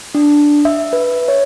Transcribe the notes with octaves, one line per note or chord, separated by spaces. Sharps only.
D4
E5
B4
C#5